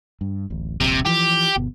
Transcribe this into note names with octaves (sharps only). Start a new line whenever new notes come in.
G2
D1 A1
D#1 A#1 C3
E3 F3 G4
G1 B2